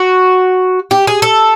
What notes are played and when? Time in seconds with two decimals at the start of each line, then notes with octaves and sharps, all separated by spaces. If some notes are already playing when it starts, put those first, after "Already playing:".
Already playing: F#4
0.91 G4
1.07 G#4
1.22 A4